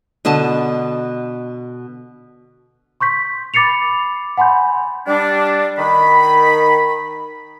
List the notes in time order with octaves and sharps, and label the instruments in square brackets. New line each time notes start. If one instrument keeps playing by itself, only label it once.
[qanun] B2 D3 D#5 A5
[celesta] C6 C#6 G6 B6
B5 D6 A6 C7 C#7 F7
F#5 G#5 B5 C6 G6
[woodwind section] G3 D4
D#3 B5